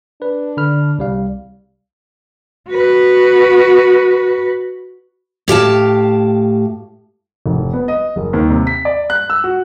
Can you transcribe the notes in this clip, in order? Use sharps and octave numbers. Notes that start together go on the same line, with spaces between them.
D4 B4
D3 B5 F6
C2 G3 F5
F#4 B4
A2 G4 F5 A5
F1
B3
D#5
F#1
D#2
C3
B6
D5
F#6
E6
F#4